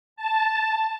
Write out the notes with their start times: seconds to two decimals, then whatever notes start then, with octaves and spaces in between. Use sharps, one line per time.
0.16 A5